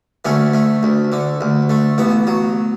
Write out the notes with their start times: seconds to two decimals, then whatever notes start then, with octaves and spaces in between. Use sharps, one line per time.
0.25 D2 A3 C#4
0.54 A3
0.83 D2
1.12 D3
1.41 D2
1.70 A3
1.98 A1 B3
2.27 F#3